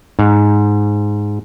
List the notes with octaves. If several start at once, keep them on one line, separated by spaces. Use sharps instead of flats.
G#2